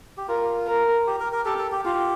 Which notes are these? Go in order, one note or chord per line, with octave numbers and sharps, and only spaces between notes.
G4
F4 A#4
A#4
G4
A#4
A#4
G4 A4
A4
G4
F4 G4